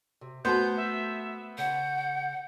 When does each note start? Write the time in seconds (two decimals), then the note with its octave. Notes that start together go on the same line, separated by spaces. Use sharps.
0.21 C3
0.45 A3 B3 F#4 C5 A5 G6
0.77 E5
1.58 C#3 F#5 G6